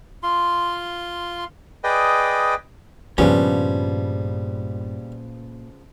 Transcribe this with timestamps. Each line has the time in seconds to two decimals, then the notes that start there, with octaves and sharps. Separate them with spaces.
0.23 F4 C6
1.84 G#4 B4 D5 D#5 G5
3.18 G2 A#2 C#3 F3 G3 B3 C#4 D4